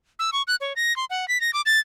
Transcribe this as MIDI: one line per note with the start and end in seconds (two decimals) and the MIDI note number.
0.19 0.30 88
0.33 0.42 85
0.47 0.55 90
0.61 0.73 73
0.76 0.95 94
0.96 1.05 84
1.10 1.28 78
1.28 1.40 95
1.41 1.51 94
1.53 1.61 86
1.66 1.80 93